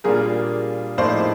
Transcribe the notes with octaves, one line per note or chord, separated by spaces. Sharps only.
A#2 G3 A#3 D4 F4 G#4 A#4
A2 F3 A#3 D#4 C5 D5